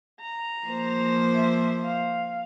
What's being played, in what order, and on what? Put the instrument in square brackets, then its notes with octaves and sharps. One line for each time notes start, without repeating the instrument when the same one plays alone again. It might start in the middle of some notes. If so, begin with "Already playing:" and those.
[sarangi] A#5
[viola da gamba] F3 A#3 C5
[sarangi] E5
F5